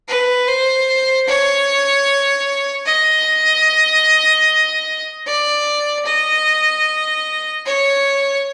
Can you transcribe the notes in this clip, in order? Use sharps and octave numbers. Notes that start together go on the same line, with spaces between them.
B4
C5
C#5
D#5
D5
D#5
C#5